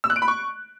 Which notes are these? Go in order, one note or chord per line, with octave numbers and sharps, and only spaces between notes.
E6
F#6
D7
B5
C#6